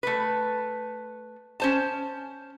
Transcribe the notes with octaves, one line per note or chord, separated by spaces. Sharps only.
A3 B4
C#4 C5 A5